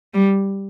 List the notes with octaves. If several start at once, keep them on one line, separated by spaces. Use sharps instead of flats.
G3